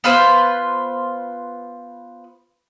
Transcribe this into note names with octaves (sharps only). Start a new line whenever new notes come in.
B3 F4 B4 C5